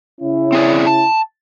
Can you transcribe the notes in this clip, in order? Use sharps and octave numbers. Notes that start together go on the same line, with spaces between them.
C#3 C#4 E4
C4 G#4 D5
A5